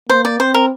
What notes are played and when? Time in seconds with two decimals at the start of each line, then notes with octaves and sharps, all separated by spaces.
0.09 A#3 C5
0.25 D5
0.39 C4 C5
0.54 A#4